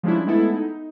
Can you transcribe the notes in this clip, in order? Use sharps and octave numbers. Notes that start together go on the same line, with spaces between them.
F3 G3 G#3 C#4 D4 E4
G#3 A3 B3 E4 A4
D#4